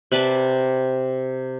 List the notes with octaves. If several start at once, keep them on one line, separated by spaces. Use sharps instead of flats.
C3 B4 D5 A5